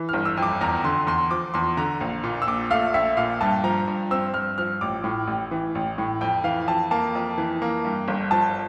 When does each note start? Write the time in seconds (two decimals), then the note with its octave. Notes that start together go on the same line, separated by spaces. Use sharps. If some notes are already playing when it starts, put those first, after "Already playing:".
Already playing: E3
0.09 G1 F6
0.25 E6
0.37 F2
0.43 D6
0.61 E2 A#5
0.84 D3 C6
1.07 E2 C6
1.31 F3 D6
1.54 E2 C6
1.77 D3 A#5
2.01 A#1
2.24 A#2
2.42 E6
2.47 A#1 D6
2.71 A3 F5
2.94 A#1 E5
3.17 A#2 F5
3.41 G2 A5
3.64 F3 A#5
3.88 G2
4.11 C4 E6
4.34 G2 F6
4.58 F3 F6
4.81 A1 D6
5.04 A2
5.27 A1
5.51 E3
5.75 A1
5.98 A2
6.21 F2 G5
6.44 E3 F5
6.68 F2 A5
6.91 A#3 A5
7.15 F2
7.38 E3
7.62 A#3
7.85 G2
8.08 G1
8.31 F3 A5